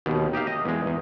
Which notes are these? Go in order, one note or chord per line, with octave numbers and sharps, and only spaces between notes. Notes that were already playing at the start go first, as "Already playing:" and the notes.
D#2 B2
D#4 G4 E5 F5
D#5
E2 G#3
E2